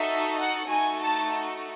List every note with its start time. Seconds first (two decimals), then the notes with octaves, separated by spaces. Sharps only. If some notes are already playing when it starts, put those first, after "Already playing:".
Already playing: D#4 F#4 A4 E5
0.36 F#5
0.68 A3 D#4 F#4 A4 G#5
1.00 A5